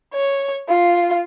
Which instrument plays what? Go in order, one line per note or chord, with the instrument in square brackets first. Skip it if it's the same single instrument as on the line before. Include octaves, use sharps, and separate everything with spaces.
[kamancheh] C#5
F4